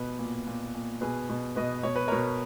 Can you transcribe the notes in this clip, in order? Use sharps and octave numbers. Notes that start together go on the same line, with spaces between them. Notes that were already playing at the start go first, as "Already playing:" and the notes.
Already playing: B2 B4
A#2
A#2
A#2
B2 G#4 B4
B2
B2 B4 D#5
B2 C#5
B4
B2 A#4 C#5